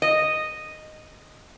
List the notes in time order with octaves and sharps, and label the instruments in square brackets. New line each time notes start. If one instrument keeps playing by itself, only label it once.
[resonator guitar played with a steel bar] D#5